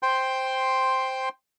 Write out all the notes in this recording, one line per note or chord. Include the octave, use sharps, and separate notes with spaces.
C5 G5 C6